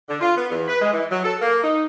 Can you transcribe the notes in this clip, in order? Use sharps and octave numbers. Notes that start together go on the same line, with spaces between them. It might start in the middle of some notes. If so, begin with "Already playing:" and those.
D3
F4
B3
E2
B4
G#3
E3
F#3
A4
A#3
D#4